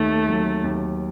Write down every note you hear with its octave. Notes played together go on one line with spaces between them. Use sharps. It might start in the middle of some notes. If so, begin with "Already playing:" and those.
Already playing: D#2 D#3 A3
F#3
D#2